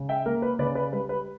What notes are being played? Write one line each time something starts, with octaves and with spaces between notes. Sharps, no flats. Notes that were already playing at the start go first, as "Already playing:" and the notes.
Already playing: C#3
E5 G5
A#3 A#4
B4
C#3 B4 D5
B4 D5
G3 B4
B4